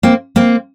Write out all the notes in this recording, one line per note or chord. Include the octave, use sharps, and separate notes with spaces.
A#3 C4
A#3 C4